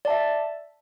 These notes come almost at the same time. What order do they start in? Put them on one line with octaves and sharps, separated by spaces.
D5 A5 E5